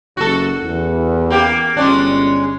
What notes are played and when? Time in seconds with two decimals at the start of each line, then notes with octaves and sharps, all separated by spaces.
0.17 F#1 F#4 A4
0.63 E2
1.30 A#3 G4
1.77 G1 G#3 C#4 D4